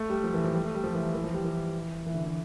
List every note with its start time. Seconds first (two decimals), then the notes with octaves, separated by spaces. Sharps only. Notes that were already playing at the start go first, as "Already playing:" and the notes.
Already playing: A3
0.10 G3
0.24 F3
0.34 E3
0.44 F3
0.54 G3
0.64 A3
0.75 G3
0.84 F3
0.95 E3
1.14 E3
1.24 F3
1.34 G3
1.44 E3
2.06 E3
2.14 D3
2.25 E3